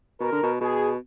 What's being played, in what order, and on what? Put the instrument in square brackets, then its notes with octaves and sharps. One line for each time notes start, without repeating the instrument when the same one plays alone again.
[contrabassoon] B2 [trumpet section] A#4
[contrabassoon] D3
B2
[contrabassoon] B2 [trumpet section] G#4